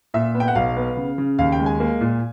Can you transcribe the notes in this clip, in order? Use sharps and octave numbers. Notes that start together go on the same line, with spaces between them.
A#2 E5
B3
G5
F#5
B1 F5
B3
C#3
C#3
D#2 F5
G5
G#3
G#5
A#3
A#2